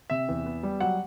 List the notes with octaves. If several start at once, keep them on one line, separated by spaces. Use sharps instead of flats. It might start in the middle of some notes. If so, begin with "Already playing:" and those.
C3 E5
E2
B3
G3
F#3 F#5